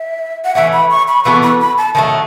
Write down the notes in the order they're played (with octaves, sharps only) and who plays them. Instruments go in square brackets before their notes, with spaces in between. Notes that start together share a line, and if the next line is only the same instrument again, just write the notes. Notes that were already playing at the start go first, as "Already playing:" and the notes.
Already playing: [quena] E5
F#5
[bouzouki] E3 A3 C#4 [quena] E5
[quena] B5
C#6
B5
[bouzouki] E3 B3 F#4 A4 [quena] C#6
[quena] B5
B5
A5
[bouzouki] D#3 F#3 A3 [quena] A5